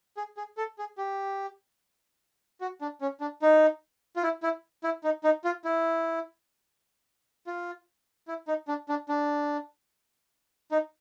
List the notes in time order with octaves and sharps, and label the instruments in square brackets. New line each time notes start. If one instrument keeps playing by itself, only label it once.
[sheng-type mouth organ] G#4
G#4
A4
G#4
G4
F#4
D4
C#4
D4
D#4
F4
E4
E4
E4
D#4
D#4
F4
E4
F4
E4
D#4
D4
D4
D4
D#4